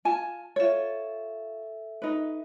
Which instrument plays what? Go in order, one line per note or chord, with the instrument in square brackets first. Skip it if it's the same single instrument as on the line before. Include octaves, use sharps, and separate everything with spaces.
[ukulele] F4 G#5 A5
[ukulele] F4 C#5 [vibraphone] A4 E5
[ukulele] D#4 B4